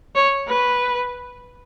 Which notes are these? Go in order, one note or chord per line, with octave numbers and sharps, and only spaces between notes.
C#5
B4